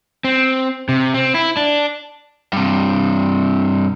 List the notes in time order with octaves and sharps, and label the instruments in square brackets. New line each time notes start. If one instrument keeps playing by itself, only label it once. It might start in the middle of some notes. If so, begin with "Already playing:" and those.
[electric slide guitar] C4
C3
C4
E4
D4
[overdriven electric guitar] G2 C3